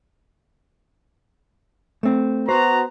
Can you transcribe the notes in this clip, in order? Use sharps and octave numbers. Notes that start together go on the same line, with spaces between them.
A3 C4
B3 F#4 C5 A#5